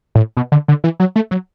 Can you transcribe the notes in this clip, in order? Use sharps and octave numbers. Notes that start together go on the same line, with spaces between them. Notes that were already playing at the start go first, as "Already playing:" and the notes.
A2
B2
D3
D3
E3
F#3
A3
F#3